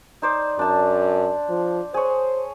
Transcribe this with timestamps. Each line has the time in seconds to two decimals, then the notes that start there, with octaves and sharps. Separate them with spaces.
0.22 D#4 C5 D5
0.59 F#2 D4 A5
1.49 F3
1.94 G#4 C5 C#5